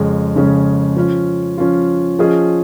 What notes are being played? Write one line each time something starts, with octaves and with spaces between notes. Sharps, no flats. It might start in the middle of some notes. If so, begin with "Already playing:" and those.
Already playing: F2 C#3 G#3 C#4 G#4
F2 C#3 G#3 C#4 G#4
F3 C#4 F4
F3 C#4 F4
F3 C#4 F4 G#4 D#5